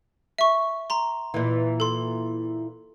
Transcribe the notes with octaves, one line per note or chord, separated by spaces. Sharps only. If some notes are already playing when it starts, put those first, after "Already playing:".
E5 C#6
A#5 C6
A#2 E3
A4 C6